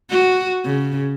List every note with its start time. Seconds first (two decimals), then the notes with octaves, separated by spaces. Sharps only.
0.10 F#4
0.65 C#3